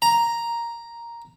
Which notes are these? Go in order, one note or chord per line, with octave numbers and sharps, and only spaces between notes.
A#5